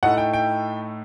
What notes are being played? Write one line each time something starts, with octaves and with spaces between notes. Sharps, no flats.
A2 A3 D#4 F#5
G5
G5